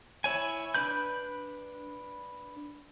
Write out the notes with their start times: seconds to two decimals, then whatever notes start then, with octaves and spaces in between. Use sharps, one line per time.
0.24 E4 C#5 G#5
0.74 D4 B4 B5 G6